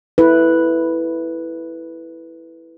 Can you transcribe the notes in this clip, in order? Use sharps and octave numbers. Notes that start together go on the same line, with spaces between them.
E4 A4 B4